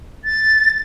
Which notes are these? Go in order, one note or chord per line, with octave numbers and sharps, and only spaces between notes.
A6